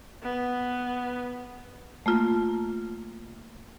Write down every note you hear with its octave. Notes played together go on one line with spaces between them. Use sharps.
B3
A3 A#3 F4